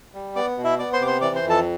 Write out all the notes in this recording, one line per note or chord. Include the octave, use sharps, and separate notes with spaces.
G3
B3 D5 D6
B2
E4 E5
B3 D5 D6
C5 C6
C3 D6
C5 C6
E3 D5 D6
C5 C6
F2
A4 A5